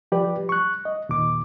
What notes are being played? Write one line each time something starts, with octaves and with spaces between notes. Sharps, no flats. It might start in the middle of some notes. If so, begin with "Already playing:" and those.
F3 G4 B4 D5
C#6 F#6
D#5
D#2 A#2 D6